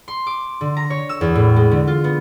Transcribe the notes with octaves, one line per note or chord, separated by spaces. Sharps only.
C6
D6
D3
A#5
C#5
E6
E2
A2
G#3
D3
F4
B3